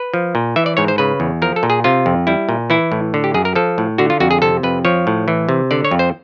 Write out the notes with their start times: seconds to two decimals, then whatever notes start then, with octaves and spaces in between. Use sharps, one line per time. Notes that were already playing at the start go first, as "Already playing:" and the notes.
Already playing: B4
0.14 F3
0.35 A#2
0.56 E3 E5
0.66 D5
0.77 G#2 C#5
0.88 C5
0.98 C#3 B4
1.20 E2
1.42 F3 A#4
1.56 A4
1.63 A#2
1.70 G#4
1.84 C3 F4
2.06 F2
2.27 G3 E4
2.49 A#2
2.70 E3 E4
2.92 A2
3.14 D3
3.24 G4
3.34 F#2 G#4
3.45 A#4
3.55 F3 A4
3.78 A2
3.98 D3 F#4
4.10 F4
4.20 F2 F#4
4.31 G#4
4.42 C3 A4
4.63 F2 B4
4.85 F3 C#5
5.07 A2
5.28 E3
5.49 C3
5.71 D3 D5
5.85 C#5
5.91 F2
5.99 C5